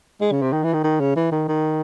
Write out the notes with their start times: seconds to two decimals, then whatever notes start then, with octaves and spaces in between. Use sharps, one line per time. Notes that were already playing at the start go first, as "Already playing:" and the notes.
0.21 G#3
0.32 C#3
0.42 C3
0.53 D#3
0.64 E3
0.74 D#3
0.84 D#3
1.00 C#3
1.16 E3
1.32 D#3
1.48 D#3